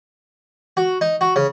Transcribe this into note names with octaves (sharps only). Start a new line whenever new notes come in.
F#4
D#4
F#4
C#3